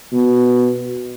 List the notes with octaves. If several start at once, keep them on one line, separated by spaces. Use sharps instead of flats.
B2